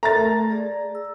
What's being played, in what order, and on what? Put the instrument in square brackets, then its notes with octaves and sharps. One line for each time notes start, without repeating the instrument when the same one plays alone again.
[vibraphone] A4 A#4 E5 [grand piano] A#5 A6
[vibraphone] A3
G#4 D5
E6